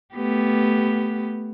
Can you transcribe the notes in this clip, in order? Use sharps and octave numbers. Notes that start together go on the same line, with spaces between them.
A3 B3 G4